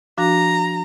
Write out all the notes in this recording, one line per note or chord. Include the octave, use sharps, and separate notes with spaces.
F3 D4 F#4 A#5